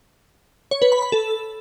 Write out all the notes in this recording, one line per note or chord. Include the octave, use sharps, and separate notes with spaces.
C#5
B4
B5
B5
A4